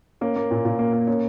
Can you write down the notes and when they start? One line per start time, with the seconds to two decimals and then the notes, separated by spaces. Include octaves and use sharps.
0.21 A#3 C#4
0.36 A#3
0.51 A#2
0.65 A#2
0.79 A#3
0.93 A#3
1.07 A#3 C#4